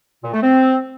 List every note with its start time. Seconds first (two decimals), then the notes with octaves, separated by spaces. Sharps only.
0.23 A#2
0.32 A3
0.42 C4